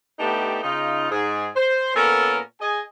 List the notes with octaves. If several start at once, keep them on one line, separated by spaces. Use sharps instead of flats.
A3 B3 D4 D#4 G4
C#3 D#4 F4
G#2 G#4
C5
A#2 B3 C#4 A4 A#4
G#4 D#5 G#5